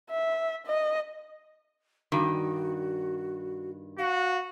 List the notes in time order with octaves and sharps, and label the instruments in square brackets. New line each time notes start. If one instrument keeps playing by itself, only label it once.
[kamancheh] E5
D#5
[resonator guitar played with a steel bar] G2 D#3 [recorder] F#4
[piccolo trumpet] F#4 [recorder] F5